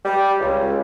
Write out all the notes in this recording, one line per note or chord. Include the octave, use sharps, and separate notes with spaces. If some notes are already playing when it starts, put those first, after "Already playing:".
G3
C#2